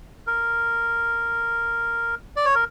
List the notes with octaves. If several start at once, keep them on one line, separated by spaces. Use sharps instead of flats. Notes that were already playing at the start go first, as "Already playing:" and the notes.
A#4
D5
C#5
A#4